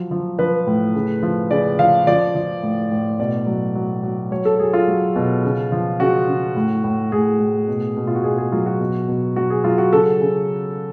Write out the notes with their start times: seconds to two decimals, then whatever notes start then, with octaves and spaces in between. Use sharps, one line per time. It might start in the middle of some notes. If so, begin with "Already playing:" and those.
Already playing: F3 F#3
0.11 F3
0.39 F3 B4
0.67 A2
0.95 C#3
1.23 F3
1.51 C#3 D5
1.79 F3 F5
2.07 F3 D5
2.35 F3
2.63 A2
2.91 A2
3.20 B2 D5
3.47 F#3
3.76 F#3
4.03 F#3
4.31 F#3 C#5
4.45 A4
4.60 F#3 G#4
4.73 F4
4.88 F#3
5.16 B2
5.44 C#3
5.72 F3
6.00 C#3 F#4
6.28 C#3
6.56 A2
6.84 A2
7.12 A2 G#4
7.39 A2
7.68 B2
7.97 B2
8.07 F4
8.15 F#4
8.24 B2 G#4
8.38 G#4
8.52 F#3 F4
8.66 F#4
8.80 B2
9.08 B2
9.36 F#3 F#4
9.50 G#4
9.64 F#3 F4
9.78 F#4
9.93 C#3 A4
10.21 C#3